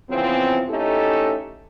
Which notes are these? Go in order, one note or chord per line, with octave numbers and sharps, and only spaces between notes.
C#3 E3 F3 B3 C4
A3 C#4 D#4 E4 G4 A4